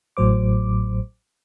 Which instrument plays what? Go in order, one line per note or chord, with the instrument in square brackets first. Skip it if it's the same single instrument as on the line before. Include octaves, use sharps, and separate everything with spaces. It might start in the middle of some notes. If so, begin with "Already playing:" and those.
[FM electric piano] A1 A2 F#3 C5 D6